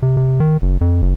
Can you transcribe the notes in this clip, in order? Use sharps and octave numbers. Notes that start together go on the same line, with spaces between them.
C3
C3
D#3
F#1
F2
F#1